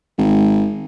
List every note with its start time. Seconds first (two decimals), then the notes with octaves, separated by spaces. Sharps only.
0.18 G#1